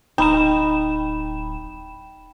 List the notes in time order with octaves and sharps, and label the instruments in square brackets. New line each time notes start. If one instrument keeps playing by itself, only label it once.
[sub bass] D1 [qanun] D#4 [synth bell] G5 B5 E7